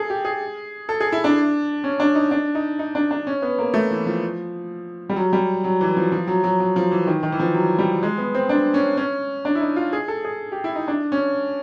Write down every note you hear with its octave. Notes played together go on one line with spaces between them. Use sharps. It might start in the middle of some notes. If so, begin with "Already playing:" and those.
Already playing: G#4 A4
G4
G#4
A4
G#4
E4
D4
C#4
D4
D#4
D4
D#4
D#4
D4
D4
C#4
B3
A#3
A3
E3
F3
G3
F#3
G3
F#3
E3
F3
F3
F#3
F#3
F#3
F3
E3
D#3
D#3
E3
F3
F#3
G3
G#3
B3
C4
D4
C#4
C#4
D4
E4
D#4
F4
G#4
A4
G#4
G4
E4
D#4
D4
C#4